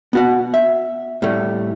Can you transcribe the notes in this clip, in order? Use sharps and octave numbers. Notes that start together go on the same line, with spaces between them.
B3 F#4 F#5
E5
A2 G3 A3